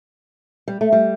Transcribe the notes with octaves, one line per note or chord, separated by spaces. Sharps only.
G3
A3
G3